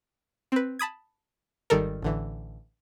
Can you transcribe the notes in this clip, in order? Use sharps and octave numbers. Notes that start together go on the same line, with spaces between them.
C4 B4
A5 B5 D#6 G#6
G#1 D#3 G3 A4 A#4
A1 D3 E3